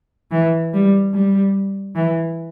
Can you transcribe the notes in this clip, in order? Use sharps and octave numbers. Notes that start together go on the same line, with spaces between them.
E3
G3
G3
E3